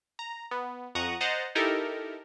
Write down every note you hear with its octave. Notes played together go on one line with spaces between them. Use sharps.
A#5
B3
F2 F#5 A#5 C#6 D#6 F#6
C5 D#5 F#5 A#5 A6
D#4 E4 G4 A4 A#4